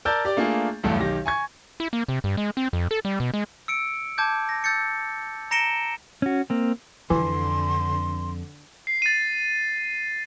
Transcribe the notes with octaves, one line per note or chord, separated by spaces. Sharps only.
A#4 D5 A5 E6 G6 A6
G4 D5
A3 A#3 D4 F4 G#4
B1 E2 G2 A3
B1 D#3 G4 A#6
G#5 C#6 G#6
E4
A#3
C3
G2
G#3
C4
F2
A4
G3
B2
G#3
E6 C#7 D7
A5 D6 G6 G#6
A#6
E6 G6 A6 C#7
A#5 A#6 C#7 D7 E7 G7
C#4 F#4
A#3 C4
F2 D3 E3 C6
C7
A6 D#7